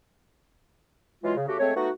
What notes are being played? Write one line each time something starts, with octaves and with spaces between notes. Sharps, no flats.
E3 F#3 G#3 F4
C#3
C#3 A3 F#4 G4
G#3 A3 C4 C#5
A3 B3 D#4 F#4